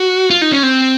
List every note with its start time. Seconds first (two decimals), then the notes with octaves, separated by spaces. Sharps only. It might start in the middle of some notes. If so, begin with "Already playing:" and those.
Already playing: F#4
0.30 F4
0.42 D#4
0.52 C#4
0.63 C4